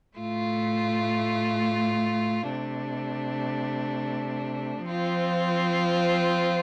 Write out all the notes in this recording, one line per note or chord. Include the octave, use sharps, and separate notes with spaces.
A2 A3 F4
C3 A3 D4
F3 C4 F4